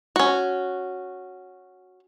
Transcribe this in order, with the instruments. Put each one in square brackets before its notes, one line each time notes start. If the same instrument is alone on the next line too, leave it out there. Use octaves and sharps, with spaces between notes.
[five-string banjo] C#4 F#4